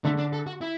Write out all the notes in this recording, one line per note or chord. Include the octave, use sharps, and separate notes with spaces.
D3 A3
D4
A4
F#4
E4